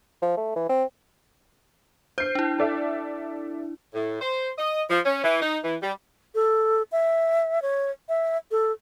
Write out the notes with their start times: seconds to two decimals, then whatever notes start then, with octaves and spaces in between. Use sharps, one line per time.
0.22 F3
0.37 A3
0.56 E3
0.69 C4
2.18 C5 G6 C7
2.35 D4 E4
2.58 A4 D5 E5
3.94 A2
4.21 C5
4.58 D#5
4.90 F3
5.05 C#4
5.24 E3
5.42 D#4
5.64 E3
5.82 G3
6.35 A4
6.92 E5
7.62 C#5
8.09 E5
8.51 A4